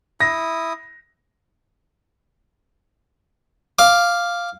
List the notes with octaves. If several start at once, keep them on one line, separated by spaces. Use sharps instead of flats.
E4 D#6 A#6
F5 D6